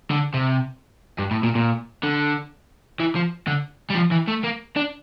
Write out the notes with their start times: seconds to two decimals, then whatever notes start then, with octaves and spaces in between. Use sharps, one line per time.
0.11 D3
0.34 C3
1.19 G2
1.31 A2
1.43 A#2
1.55 A#2
2.04 D3
3.00 E3
3.15 F3
3.47 D3
3.90 G3
3.95 F3
4.11 E3
4.28 A3
4.43 A#3
4.76 D4